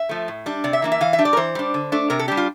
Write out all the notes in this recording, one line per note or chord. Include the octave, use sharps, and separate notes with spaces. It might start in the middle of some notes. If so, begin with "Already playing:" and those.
Already playing: E5
F3 A3
A2
G3 D4
C3 D5
E5
E3 A#3 D4
E5
E3 F5
E5
G3 D4
D5
A#4
E3 C5
G3 D4
D3
A3 D4
C3 A#4
A4
G3 D4 G4
F4